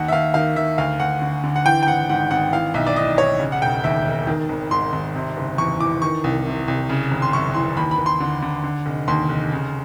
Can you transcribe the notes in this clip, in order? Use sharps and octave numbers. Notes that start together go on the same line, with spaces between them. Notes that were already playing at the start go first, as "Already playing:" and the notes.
Already playing: D#2 F#5
E5
D#2 F5
D#3 F5
D#3 E5
D2 F5
D2 F#5
D3
D3
F#5
E3 G5
G5
G#1 F#5
G#2 F#5
G#1 F#5
E3 F5
B1 E5
D5
A2 D#5
B1 C#5
C#3
F#5
E1 G5
D#2 E5
E1
D#3
G#1
G#2 C6
G#1
C3
F#1
E2 C#6
E3 D6
D#3 C#6
C2
C3
C2
C#3
G#1
C6
F#2 C#6
E3 C6
D#2 B5
B5
D#2
C6
D3
D3
D3
F1
D#2 C6
F1
C#3